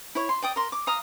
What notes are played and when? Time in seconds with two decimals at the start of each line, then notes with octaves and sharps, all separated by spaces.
0.15 E4 C#5
0.29 C6
0.42 D5 G5 D#6
0.56 A#4 C6
0.72 D6
0.87 F5 A#5 D#6